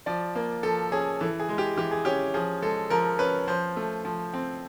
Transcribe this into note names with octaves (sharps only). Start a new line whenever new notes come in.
F3 D5
A#3
F3 A4
C#4 G#4
E3 A4
G#4
G#3
G4
E3 G4
G#4
C#4 G4
F3 G#4
G#3 A4
F3 A#4
C#4 B4
F3 C5
A3
F3
C4